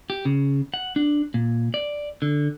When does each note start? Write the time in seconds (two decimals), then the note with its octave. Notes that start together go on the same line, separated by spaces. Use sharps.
0.10 G4
0.25 C#3
0.74 F#5
0.96 D4
1.34 A#2
1.74 D5
2.22 D3